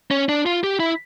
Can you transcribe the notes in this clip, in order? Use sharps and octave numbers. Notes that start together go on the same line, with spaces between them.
C#4
D4
F4
G4
E4